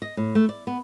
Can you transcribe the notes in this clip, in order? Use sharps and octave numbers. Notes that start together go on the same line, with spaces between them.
D#5
A2
A3
D5
B3